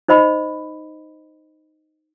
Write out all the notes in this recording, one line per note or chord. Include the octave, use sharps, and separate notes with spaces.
D#4 C5 D#5 B5